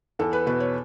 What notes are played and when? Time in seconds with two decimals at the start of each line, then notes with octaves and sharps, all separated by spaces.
0.19 E2 A4
0.33 B4
0.46 B2 B4
0.60 C#5